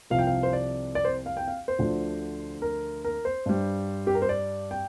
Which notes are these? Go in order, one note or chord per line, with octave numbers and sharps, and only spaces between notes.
C2 C3 F3 F5
G5
F5
C5
D5
D5
C5
F5
G5
F5
C5
D2 D3 F3
A#4
A#4
C5
G2 G3
G4
A#4
C5
D5
G5